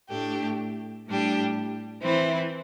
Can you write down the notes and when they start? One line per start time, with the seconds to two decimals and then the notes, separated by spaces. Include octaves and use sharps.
0.10 A2 A3 D4 G4
1.07 A2 G3 D4 G4
2.03 E3 C4 E4